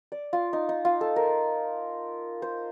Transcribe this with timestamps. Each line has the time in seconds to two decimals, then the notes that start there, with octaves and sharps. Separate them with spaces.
0.12 D5
0.33 F4
0.53 D#4
0.69 D#4
0.85 F4
1.01 A4
1.16 A#4
2.42 C5